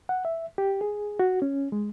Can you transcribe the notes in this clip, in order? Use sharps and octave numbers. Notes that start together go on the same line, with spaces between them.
F#5
E5
G4
G#4
F#4
C#4
G#3